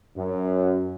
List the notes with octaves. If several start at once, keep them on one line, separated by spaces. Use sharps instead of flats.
F#2